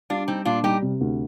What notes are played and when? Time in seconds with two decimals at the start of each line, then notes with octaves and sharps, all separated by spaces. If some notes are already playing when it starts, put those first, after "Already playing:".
0.10 G3 D4 F4
0.28 G3 C4 D#4
0.45 A#2 D4 F4
0.63 G3 D#4 G4
0.82 C3
1.01 D2